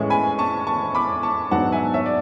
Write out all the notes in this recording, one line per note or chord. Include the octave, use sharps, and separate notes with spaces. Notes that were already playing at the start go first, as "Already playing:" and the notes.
Already playing: A2 E3 G#3 C#4 C#6
G#5 B5
A5 C#6
A5 C#6
B5 D6
A5 C#6
G#2 F#3 B3 D4 F#5 A5
E5 G#5
C#5 E5
D5